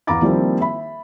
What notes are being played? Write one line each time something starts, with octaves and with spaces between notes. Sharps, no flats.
E2 F5 A#5 B5 D6 A6
D#3 F3 G3 A#3 C4 E4
E5 B5